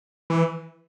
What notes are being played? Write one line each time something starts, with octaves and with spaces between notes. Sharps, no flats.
E3